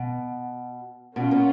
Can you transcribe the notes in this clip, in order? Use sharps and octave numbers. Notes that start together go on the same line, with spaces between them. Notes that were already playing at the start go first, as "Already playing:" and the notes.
Already playing: B2
B2 A#3 C#4 F4
B2